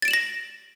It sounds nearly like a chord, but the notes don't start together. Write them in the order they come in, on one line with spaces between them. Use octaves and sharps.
A6 D7 E7 F#7 A#6